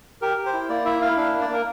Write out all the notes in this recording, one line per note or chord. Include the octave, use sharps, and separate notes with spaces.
G4 A#4
G4
C5
E4
A#3 D5
E4 E5
E4 F5
D4 F5
A#3
D5
A#3 A#4